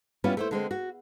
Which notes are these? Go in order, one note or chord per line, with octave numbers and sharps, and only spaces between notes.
G3 B3 C#4 E4 F4
A3 E4 C5
D3 G#3 C4
F#4